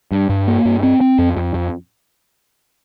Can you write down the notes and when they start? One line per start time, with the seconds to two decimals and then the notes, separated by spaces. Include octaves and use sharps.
0.12 G2
0.29 G2
0.47 A#3
0.65 G2
0.83 C4
1.01 C4
1.19 F2
1.37 F2
1.54 F2